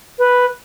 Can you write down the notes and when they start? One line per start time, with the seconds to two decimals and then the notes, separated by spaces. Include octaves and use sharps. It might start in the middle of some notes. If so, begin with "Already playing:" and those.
0.19 B4